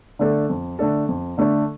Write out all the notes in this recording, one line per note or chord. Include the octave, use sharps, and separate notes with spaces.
D3 A3 D4 A4
F2
D3 A3 D4 A4
F2
D3 A3 D4 A4